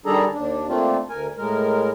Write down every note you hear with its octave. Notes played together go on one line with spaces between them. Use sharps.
D#3 G3 D4 G#4 A4 A#5
D#2 D4
A3 A#3 C4 D4 F4
D2 A#4 G#5
A2 G#3 A#4